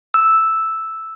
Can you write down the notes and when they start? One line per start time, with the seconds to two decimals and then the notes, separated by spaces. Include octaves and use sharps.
0.14 E6